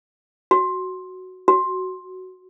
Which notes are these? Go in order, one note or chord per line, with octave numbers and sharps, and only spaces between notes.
F#4
F#4